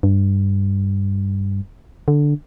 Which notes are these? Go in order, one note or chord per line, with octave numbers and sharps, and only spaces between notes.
G2
D3